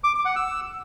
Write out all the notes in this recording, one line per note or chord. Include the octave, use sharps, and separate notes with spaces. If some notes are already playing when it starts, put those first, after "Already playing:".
D6
D6
F#5
E6